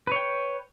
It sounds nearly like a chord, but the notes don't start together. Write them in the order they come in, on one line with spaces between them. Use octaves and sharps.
B4 C#5 G5